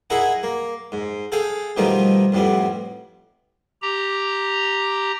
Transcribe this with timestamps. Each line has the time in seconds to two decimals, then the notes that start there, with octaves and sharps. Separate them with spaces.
0.10 D#4 E4 G#4 A#4 E5 F#5
0.43 A#3
0.92 G#2
1.32 G#4 A4 F5 G5
1.77 B2 D#3 F3 G3 A3 D#4
2.32 F2 A2 G3 B3
3.82 G4 A#5